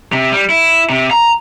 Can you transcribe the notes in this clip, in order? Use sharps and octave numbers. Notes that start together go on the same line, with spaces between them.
C3
G3
E4
C3
A#5